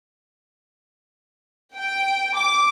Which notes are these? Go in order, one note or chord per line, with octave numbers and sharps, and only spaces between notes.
G5
D6